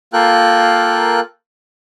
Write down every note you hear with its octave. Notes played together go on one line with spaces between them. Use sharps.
A#3 F4 A4 A#4 G5 F#6